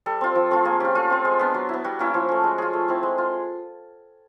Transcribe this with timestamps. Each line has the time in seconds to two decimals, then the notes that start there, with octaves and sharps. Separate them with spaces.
0.06 G3 A4
0.21 C4 F4
0.35 F3
0.50 A3 C4 F4
0.65 A#3 G#4
0.80 C#4 F4 G4
0.95 A3 F4
1.10 C4 F4
1.25 G#3
1.39 B3 D4
1.54 F#3
1.69 B3 E4
1.84 G3 F#4
1.99 A#3 C#4 E4
2.14 F3
2.29 A3 C#4
2.44 G#3
2.58 C#4 F4 G#4
2.73 A3
2.88 C4 E4
3.03 G#3
3.18 F4